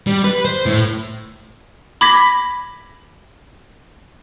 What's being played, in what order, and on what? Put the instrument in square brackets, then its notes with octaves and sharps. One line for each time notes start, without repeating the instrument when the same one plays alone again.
[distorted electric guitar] G3
B4
C5
A2
[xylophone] B5 D6 G#6 A#6 B6